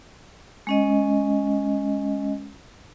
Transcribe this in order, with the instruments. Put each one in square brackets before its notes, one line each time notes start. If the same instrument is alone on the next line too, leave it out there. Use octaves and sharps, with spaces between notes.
[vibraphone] G#3 C#4 D#5